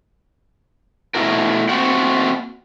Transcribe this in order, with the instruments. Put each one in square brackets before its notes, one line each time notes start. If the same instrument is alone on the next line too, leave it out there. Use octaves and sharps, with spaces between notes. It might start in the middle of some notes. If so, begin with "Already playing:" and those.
[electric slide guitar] B2 A3 E4 F#4 A#4
A3 A#3 C4 F#4 F#5 G5